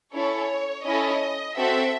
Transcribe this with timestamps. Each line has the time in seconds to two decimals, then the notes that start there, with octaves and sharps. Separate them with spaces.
0.14 C#4 E4 A4 C#5
0.85 C#4 E4 A4 D#5
1.57 C4 F#4 A4 E5